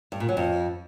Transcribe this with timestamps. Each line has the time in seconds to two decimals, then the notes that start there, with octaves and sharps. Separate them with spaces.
0.12 G2
0.20 A#2
0.29 F#3
0.37 F2